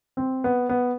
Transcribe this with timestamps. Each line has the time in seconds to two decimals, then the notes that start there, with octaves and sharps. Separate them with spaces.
0.17 C4
0.44 B3
0.69 B3